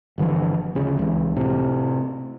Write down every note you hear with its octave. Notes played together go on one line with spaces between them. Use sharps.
G1 D3 E3 F3
D2 C#3
C#2 E3
A2 C3